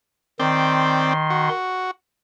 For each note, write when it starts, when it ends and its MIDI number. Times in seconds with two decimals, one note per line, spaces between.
0.40 1.49 51
0.40 1.13 60
0.40 1.13 74
0.40 1.49 84
1.30 1.91 66